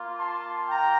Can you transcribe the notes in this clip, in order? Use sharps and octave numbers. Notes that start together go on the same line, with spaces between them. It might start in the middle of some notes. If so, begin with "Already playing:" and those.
Already playing: A#3 F4
A5 C6
G5 A#5